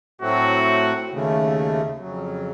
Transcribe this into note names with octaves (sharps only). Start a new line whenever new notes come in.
A2 F#3 A3 C4 F#4
D#2 C#3 A3
F2 C#3 F#3